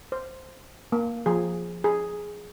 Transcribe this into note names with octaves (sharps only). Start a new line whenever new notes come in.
C5
A#3
F3 G#4
G#4